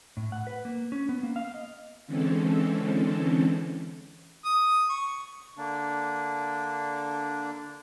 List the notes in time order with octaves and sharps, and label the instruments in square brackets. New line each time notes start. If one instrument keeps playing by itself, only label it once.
[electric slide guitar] A2
F#5
B4
A#3
C#4
B3
A#3
F5
D#5
[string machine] D3 E3 G#3 C4 C#4 A4
[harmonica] D#6
C#6
[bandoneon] D3 A#3 D4